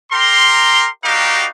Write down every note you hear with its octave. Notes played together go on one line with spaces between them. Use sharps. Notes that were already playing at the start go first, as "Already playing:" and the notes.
G4 A#4 A#5 C6
G3 D#4 F#4 G4 A#4 F5